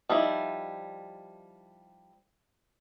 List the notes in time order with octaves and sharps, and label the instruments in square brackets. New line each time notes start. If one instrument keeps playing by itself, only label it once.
[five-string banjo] F3 G3 D#4 E4